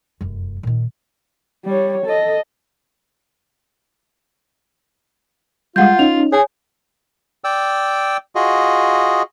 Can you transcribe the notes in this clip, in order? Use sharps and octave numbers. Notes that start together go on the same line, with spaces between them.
F1 F#2
A#2 D#3
G3 C#5
A4 D#5
G3 G#3 F4 F5 F#5 G6
C#4 D#4 F7
G#4 C#5 G#5
D5 G5 E6
F4 F#4 G#4 D#5